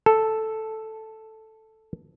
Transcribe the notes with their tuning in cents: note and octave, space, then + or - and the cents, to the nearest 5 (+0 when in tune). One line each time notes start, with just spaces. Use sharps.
A4 +0